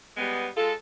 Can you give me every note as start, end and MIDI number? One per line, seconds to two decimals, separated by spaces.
0.17 0.48 55
0.17 0.48 56
0.17 0.48 59
0.57 0.73 56
0.57 0.73 65
0.57 0.73 69